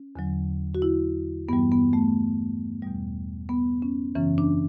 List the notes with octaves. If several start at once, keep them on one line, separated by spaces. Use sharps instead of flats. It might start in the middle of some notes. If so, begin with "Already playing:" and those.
Already playing: C#4
E2 D3 F#3
F#4
E4
G2 E3 G3 B3
B3
A3
E2 B2 G3
B3
C#4
F#2 C#3 E3 C#4
D4